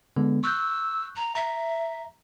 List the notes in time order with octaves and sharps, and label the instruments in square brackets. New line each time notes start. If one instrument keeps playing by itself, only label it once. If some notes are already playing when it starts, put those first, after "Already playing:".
[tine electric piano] D3 G#3 B3
[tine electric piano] C#6 F#6 G6 [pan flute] E6
[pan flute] A#5
[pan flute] E5 [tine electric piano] A#5